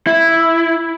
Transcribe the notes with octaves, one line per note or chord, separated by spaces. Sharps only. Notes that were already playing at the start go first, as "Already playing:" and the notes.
E4